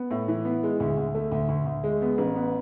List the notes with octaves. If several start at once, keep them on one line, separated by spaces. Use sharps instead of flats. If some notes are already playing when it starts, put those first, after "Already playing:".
Already playing: B3
A2
E3
B3
G#3
D2
D2
A3
D2
D2
D2
G#3
B3
A1
B3